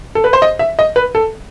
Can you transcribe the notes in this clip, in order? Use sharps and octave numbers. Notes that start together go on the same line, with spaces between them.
A4
B4
C5
D#5
E5
D#5
B4
A4